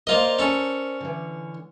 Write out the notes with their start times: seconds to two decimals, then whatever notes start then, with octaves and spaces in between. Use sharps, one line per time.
0.07 A#3 F4 A#4 C5 D5 D#5
0.39 C#4 A4
1.00 D3 E3